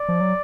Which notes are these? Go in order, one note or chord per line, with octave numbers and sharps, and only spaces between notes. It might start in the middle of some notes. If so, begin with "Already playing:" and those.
Already playing: D5
F3
F#3